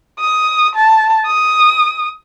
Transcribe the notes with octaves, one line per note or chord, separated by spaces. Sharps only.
D#6
A5
D#6